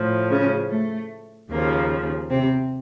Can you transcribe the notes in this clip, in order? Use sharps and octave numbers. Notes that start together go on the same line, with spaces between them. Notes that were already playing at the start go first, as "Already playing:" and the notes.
Already playing: A2 F3
C#3 C#4
A3
D#2 C#3 F3 A#3
C3 C4